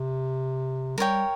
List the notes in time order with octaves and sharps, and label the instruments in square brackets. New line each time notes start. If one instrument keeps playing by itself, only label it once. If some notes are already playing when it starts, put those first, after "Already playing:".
Already playing: [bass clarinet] C3
[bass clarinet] G3 [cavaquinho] A#4 C#5 G5